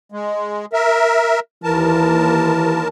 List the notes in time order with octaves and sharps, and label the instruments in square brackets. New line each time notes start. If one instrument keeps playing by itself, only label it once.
[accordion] G#3
A#4 E5
[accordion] D#2 A#4 A5 [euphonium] E3